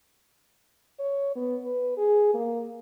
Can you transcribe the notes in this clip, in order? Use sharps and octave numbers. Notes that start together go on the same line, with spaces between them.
C#5
B3
B4
G#4
A#3